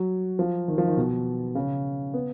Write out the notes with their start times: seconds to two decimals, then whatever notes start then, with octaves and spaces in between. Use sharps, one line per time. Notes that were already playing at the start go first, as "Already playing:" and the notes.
Already playing: F#3
0.39 F3
0.68 D#3
0.78 F3
0.88 D#3
0.97 B2
1.55 C#3
2.14 B3